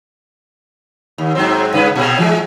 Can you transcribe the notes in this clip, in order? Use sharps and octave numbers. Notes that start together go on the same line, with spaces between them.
D#2
G#2 F#3 C4
G2 C#3 B4
A#2 C#3
E3 G#3